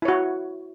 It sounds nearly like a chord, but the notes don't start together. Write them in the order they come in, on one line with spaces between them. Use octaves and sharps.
E4 C#5 F#4